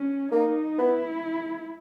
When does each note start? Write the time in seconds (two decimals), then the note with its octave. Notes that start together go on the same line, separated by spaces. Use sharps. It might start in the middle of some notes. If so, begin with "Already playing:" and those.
Already playing: C#4
0.32 A#3 D#4
0.78 B3 E4